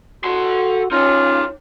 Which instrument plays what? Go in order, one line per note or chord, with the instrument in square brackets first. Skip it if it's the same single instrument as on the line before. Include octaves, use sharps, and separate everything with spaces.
[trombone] F#4 [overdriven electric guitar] A4 C6
[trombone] C#4 [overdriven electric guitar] D#4 C#5 [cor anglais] F4